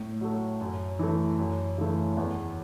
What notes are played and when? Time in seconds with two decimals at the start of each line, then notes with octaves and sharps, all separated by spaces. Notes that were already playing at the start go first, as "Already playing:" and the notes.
Already playing: A2
0.21 F#3 A3
0.61 F#2
0.99 E3 A3
1.39 F#2
1.78 C#3 E3 A3
2.17 E2